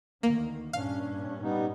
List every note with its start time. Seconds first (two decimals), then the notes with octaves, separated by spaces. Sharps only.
0.23 D2 D#3 A#3
0.73 G2 A#2 C#4 D4 F5
1.42 G3 B3 D#4